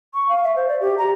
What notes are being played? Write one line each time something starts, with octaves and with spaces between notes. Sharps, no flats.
C#6
F5
E5
C5
D5
G4
A#5